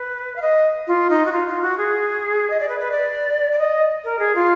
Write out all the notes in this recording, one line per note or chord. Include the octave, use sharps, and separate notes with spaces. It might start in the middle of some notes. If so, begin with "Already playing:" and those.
Already playing: B4
F5
D#5
F4
D#4
F#4
F4
F4
F#4
G#4
D#5
D5
B4
B4
D5
D5
D#5
A#4
G#4
F4